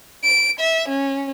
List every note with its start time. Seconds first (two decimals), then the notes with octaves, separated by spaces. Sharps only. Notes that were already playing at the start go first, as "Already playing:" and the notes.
0.23 D7
0.60 E5
0.88 C#4